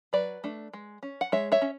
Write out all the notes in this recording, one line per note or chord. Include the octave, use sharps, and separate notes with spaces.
F#3 B4 D5
A3 D4
G#3
C#4
F#5
G#3 C#5 E5
C#5 E5
C#4